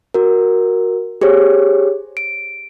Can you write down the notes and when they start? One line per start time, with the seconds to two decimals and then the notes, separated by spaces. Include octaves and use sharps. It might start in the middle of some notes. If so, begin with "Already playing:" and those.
0.14 F#4 A#4
1.21 G4 G#4 C5 C#5
2.17 D7